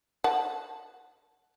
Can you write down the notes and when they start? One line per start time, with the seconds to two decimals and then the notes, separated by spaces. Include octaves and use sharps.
0.24 F#5 A5